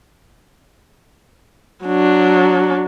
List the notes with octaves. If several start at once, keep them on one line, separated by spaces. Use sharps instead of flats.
F#3 D4